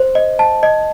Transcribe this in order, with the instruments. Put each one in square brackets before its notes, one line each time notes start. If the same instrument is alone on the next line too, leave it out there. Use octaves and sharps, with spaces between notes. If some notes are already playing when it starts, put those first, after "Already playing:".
Already playing: [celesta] C5
D#5
A5
D#5